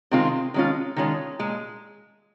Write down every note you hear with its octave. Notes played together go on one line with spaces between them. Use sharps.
C3 D#3 G#3 C4 F4
D#3 G#3 C#4 F4
D#3 G#3 C#4 F4
A#2 G#3